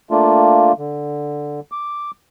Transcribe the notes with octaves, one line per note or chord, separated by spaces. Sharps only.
A3 A#3 D4 F4
D3
D6